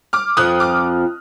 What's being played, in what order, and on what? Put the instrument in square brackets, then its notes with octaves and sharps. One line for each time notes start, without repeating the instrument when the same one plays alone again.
[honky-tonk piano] D6 F6
[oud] F2 F3 [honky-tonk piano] D#6 F#6
[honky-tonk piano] D6 F6